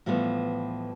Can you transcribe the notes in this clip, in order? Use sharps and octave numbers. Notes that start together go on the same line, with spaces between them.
A2 E3 F3 G3 A3 B3